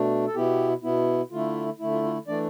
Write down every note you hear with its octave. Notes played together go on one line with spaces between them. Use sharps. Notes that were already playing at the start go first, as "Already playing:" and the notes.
Already playing: B2 A3 D4
A4
B2 B3 E4 G4
B2 B3 E4
D3 A3 E4 F4
D3 A3 E4
F4
F4
E3 A3 D4 D5